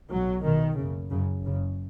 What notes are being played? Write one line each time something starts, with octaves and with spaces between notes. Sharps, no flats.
B1 B2 F#3
B1 B2 D#3
F#1 F#2 C#3
F#1 F#2 C#3
F#1 F#2 C#3